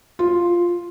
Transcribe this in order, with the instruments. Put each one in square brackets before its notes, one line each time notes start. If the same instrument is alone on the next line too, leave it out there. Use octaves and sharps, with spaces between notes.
[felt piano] F4